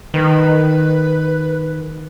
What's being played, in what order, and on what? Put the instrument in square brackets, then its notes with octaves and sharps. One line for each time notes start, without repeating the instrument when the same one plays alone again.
[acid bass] D#3 [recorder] B4